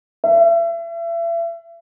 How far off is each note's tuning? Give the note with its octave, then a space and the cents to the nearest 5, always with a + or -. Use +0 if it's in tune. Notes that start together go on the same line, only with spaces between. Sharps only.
E5 +35